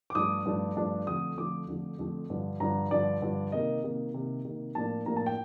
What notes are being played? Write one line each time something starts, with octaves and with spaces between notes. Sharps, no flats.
D6
G2 F3 A3 D4 D#6
G2 F3 A3 D4
G2 F3 A3 D4
F2 D3 F3 A3 D#6
F2 D3 F3 A3 D6
F2 D3 F3 A3
F2 D3 F3 A3
G2 D3 F3
G2 D3 F3 A#5
G2 D3 F3 D5
G2 D3 F3
C3 D#3 A#3 D#5
C3 D#3 A#3
C3 D#3 A#3
C3 D#3 A#3
A2 F3 A#3 D4 A5
A2 F3 A#3 D4 A#5
A5
G5